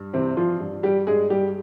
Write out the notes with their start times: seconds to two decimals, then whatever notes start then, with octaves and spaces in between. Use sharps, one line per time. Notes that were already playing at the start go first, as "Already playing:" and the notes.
Already playing: G2
0.13 C3 E3 C4
0.37 F3 F4
0.60 G2
0.83 G3 G4
1.07 G2 G#3 G#4
1.30 G3 G4